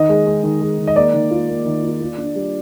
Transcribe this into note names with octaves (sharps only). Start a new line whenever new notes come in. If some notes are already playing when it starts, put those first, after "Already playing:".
Already playing: D#3 D#5
G#3
G#3
D#3
G#3
D#3
D#5
A#3 D5
D#3
F4
A#3
D#3
F4
F4
D4
G3